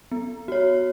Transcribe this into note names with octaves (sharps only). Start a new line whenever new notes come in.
B3
F#4 C#5